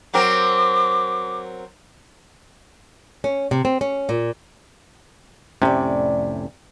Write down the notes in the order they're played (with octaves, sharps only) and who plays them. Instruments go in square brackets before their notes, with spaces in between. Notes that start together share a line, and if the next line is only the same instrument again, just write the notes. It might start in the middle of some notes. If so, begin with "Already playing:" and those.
[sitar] F#3 C4 A#4 [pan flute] D6
[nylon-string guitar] C#4
C3
C4
C#4
A#2
[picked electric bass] F1 A2 C#4 [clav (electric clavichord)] C3 [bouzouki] G3 D5